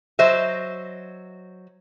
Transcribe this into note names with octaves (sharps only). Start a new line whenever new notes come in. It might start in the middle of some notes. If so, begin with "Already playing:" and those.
F#3 C5 D#5 E5